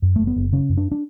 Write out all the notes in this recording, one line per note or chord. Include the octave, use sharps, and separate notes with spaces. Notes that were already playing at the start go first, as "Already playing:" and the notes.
F#2
F#1 A3
B3
F#1
C#3 C#4
F#2
D4
D4